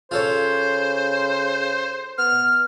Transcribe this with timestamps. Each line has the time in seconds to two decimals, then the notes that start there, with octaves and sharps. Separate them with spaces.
0.11 C#3 F4 A4 C5 C#5
2.18 B3 F6